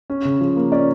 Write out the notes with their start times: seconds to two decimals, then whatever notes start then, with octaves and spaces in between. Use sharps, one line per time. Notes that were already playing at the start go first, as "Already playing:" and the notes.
0.10 C#4
0.25 C#3
0.41 F3
0.56 A#3
0.72 C#4 D5